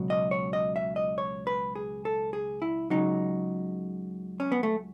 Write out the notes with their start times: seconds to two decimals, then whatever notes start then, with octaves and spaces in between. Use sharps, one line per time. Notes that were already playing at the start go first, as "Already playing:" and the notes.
Already playing: C#2 B2 F#3
0.10 D#5
0.31 C#5
0.53 D#5
0.76 E5
0.96 D#5
1.18 C#5
1.47 B4
1.75 G#4
2.05 A4
2.33 G#4
2.62 E4
2.90 C#2 C#3 F#3 D#4
4.40 C#4
4.52 B3
4.63 A3